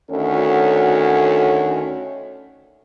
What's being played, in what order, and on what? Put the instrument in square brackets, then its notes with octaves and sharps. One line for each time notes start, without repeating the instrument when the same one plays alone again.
[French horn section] D2 D#3 C#4 F#4 A4 C#5